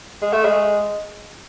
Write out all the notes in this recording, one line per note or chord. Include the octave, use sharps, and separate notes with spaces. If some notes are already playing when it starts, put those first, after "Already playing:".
G#3
A3
G#3